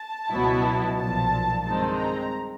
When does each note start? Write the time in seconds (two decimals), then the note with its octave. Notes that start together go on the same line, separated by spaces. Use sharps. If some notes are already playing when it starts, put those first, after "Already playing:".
Already playing: A5
0.30 C#2 B2 F#3 B3 E4
0.97 B1 A#2 F3 A5
1.64 G2 D#3 G#3 C4 D#4 A5
1.97 A#5